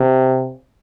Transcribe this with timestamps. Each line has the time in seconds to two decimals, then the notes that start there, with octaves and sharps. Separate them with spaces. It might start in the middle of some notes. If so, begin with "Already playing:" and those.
Already playing: C3